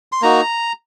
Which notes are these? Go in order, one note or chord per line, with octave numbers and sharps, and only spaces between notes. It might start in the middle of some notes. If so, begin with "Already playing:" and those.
C6
A#3 D#4 F#4 A#5